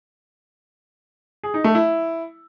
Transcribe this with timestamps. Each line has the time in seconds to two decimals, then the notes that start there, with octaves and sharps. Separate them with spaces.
1.43 G#4
1.54 D#4
1.64 A3
1.75 E4